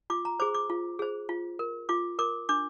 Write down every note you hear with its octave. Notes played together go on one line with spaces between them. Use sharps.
F4 D6
A#5
G#4 C5 D6
D6
F4
G#4 C5
F4
A#4
F4 D6
A#4 D6
D4 D6